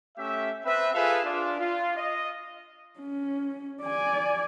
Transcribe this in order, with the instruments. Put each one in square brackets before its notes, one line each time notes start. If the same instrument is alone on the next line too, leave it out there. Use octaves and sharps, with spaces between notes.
[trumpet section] A3 C#4 G4 E5
C4 B4 E5
F4 G#4 A4 B4 E5 F5
D4 F4
F4
D#5
[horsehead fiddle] C#4
D5 G#5